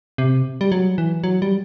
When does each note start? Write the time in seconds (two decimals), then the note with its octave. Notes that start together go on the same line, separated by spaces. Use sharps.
0.18 C3
0.61 G3
0.72 F#3
0.98 E3
1.24 F#3
1.42 G3